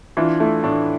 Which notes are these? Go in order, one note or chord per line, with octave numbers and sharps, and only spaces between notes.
E3 D4 F4
A3 E4
A2 D4